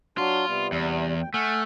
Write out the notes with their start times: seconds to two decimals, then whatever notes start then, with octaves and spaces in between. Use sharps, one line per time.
0.18 F#3 D4 F4 F#4
0.48 C3 G3 B3
0.72 E2
1.21 D2 G5
1.34 A3 F#5 G#5 F6